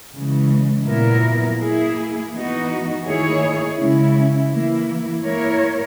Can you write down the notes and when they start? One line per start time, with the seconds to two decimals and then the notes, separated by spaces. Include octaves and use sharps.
0.15 C#3 E3 G#3
0.87 A#2 F#3 B3 E4 A#4
1.60 A#3 E4 G#4
2.33 E3 B3 D#4 F#4
3.06 D#3 A#3 E4 G#4 C#5
3.78 C#3 G#3 C#4 E4
4.51 E3 A#3 E4
5.24 A#3 E4 A#4 C#5